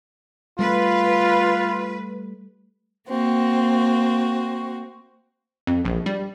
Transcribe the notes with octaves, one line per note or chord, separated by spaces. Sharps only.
G3 A3 F4 B4
A#3 C4 F#4
F2
A#1
G3